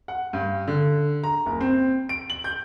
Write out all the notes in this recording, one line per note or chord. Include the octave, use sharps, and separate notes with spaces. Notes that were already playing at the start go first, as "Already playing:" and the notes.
F#5
G2
D3
A#5
F#1
C4
D7
F#7
G6